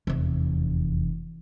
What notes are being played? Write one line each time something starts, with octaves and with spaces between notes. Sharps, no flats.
F1 E2